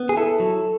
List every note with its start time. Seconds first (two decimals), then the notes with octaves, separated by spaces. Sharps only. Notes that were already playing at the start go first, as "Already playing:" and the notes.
Already playing: B3
0.09 G#4
0.17 E4 A4
0.40 F#3